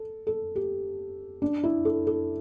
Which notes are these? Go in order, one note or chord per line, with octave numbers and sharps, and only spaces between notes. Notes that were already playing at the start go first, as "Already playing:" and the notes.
Already playing: A4
A4
G4
D4
E4
A4
A4